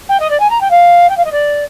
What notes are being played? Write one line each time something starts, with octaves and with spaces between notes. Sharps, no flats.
G5
D#5
D5
G#5
A#5
G5
F5
G5
F5
D#5
D5